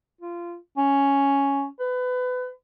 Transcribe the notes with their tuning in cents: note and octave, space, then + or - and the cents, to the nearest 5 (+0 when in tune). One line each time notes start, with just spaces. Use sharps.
F4 -20
C#4 +5
B4 +25